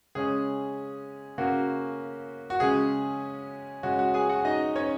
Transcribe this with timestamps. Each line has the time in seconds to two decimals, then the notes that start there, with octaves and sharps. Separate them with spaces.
0.15 C#3 G#3 C#4 G#4
1.38 C#3 A#3 C#4 F#4
2.50 F#4
2.60 C#3 G#3 C#4 G#4
3.83 C#3 G#3 C#4 F#4
3.99 F#4
4.14 G#4 G#5
4.29 F#4 F#5
4.45 D#4 D#5
4.76 C#4 C#5